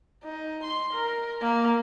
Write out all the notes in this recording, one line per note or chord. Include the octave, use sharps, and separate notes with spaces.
D#4
C6
A#4
A#3